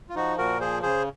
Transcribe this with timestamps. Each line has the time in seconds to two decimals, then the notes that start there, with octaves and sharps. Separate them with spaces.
0.09 F4
0.15 F3 D#4 F#4
0.37 A#2 F#4 A#4
0.60 F3 G#4 C5
0.82 C#3 G#4 C5